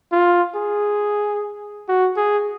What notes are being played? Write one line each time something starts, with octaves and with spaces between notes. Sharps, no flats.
F4
G#4
F#4
G#4